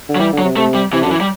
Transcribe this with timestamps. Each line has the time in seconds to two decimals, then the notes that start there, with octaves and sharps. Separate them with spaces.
0.09 D3
0.16 F#3
0.20 E3 G3
0.33 D3
0.38 F#3
0.44 C3
0.56 C3 A3
0.75 G3
0.93 C3 E3
1.02 D3
1.06 F#2
1.11 E3
1.21 G3